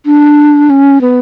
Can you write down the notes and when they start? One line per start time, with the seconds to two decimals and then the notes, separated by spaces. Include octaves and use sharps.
0.06 D4
0.70 C#4
1.01 B3